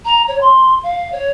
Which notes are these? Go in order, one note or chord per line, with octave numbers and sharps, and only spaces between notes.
A#5
C#5
C6
F5
C#5